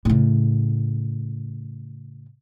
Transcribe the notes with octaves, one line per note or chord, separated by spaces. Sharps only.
A2 C#3